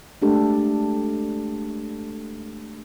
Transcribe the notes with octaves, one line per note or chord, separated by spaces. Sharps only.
G#3 A3 D4 G4 A4